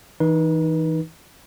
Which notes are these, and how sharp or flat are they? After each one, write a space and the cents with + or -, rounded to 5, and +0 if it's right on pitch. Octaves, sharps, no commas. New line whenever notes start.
E3 -25 D#4 +0 B4 -30